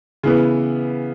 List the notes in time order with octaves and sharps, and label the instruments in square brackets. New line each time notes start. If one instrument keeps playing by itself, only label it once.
[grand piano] C#3 E3 B3